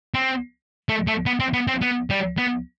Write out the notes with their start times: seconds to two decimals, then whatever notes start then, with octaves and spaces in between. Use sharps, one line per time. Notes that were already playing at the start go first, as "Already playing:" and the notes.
0.14 C4
0.89 A3
1.07 A3
1.26 B3
1.40 C4
1.53 B3
1.68 C4
1.81 B3
2.10 G3
2.37 B3